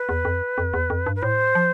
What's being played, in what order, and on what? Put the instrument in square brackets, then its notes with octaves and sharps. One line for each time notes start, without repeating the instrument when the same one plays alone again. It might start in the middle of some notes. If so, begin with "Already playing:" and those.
Already playing: [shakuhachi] B4
[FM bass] E2
F2
F2
E2
F2
G2
[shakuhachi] B4
[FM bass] A2 [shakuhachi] C5
[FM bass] F3